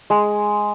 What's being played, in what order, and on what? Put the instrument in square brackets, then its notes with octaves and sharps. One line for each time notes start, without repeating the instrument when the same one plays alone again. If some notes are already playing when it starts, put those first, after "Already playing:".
[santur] G#3